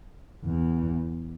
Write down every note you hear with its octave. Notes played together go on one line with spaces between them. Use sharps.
E2